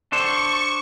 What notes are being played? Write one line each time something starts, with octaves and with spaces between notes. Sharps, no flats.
D4 A4 C5 C#6 C#7